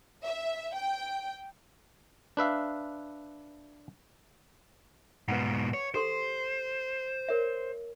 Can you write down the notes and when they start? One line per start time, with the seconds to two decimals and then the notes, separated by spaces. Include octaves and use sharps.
0.23 E5
0.75 G5
2.37 D4 B4 E5 F5
5.28 G#2 B2 B4 F#5
5.74 C#5
5.94 G4 A4 C5 C6
7.28 A#4 C#5 E5